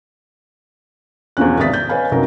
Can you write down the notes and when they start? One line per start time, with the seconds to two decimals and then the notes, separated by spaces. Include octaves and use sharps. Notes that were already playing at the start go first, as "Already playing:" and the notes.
1.37 E2 B2 F3 C#4 F#6
1.58 G#1 C3 E5 D#6 A6 B6
1.73 G6
1.89 B4 C#5 D#5 F5 G#5 B5
2.12 C2 F#2 D#4 F#4 A#4